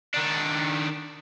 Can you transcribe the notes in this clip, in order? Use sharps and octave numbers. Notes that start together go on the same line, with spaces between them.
D#3 D4